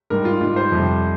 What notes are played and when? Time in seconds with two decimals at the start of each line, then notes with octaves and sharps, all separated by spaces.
0.10 G#2 G3 A#4
0.25 F4
0.41 G#2 G3 F4
0.56 C5
0.72 F2 C3 G3